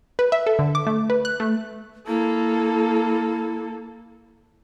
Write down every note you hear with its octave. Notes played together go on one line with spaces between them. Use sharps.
B4
E5
A4
D3
D6
A3
B4
F#6
A3
A#3 E4 A4